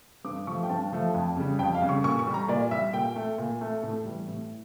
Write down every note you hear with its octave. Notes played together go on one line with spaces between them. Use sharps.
G2 D6
F3 A3 C#6
G5
G2 A5
F3 A3
F2
C#3 G3
F2 G5
F5
C#3 G3
C#6
A#2 C#6
C#6
G3
A#5
A#2 D5
G3 E5
A#2 G5
A3
A#2
A3
A2 A4
E3 G3
A2